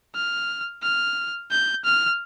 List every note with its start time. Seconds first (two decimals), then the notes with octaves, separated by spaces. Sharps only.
0.15 F6
0.83 F6
1.51 G6
1.85 F6